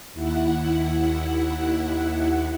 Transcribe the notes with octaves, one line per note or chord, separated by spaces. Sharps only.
D#2 E4 F#5